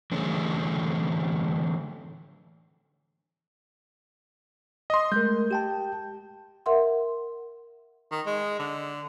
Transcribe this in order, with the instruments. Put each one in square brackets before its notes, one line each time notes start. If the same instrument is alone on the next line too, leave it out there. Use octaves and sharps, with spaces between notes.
[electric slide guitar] D3 E3 A3 C#4 G#4 A4
[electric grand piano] D#5 C6
[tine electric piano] G#3 A3 A#4 [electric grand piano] G6
[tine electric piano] G4 G5 A5
[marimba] A#4 E5 F#5 C6
[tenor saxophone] D#3
G#3
D3